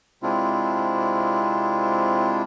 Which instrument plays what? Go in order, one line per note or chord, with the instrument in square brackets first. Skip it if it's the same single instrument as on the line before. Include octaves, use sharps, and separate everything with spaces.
[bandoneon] C3 G#3 C4 D4 E4 F4